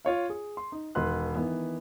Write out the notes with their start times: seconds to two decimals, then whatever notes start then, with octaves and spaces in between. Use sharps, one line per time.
0.05 F4 C#5 F5
0.30 G#4
0.57 C6
0.72 D#4
0.95 E1 D#3 B4 C6 F#6
1.35 D#3 E3 B3